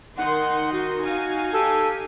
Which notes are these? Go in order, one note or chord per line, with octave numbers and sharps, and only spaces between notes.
D#3 D#4 F#5 C6
F#4
D#4 F5 G#5
G4 A4